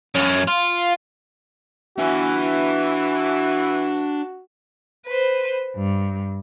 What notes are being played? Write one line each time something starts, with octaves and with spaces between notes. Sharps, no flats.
F#2 C#4
F4
E3 D4 F#4 G#5
B4 C5
G2